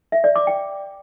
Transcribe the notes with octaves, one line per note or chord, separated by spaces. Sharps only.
E5
D5
D6
G5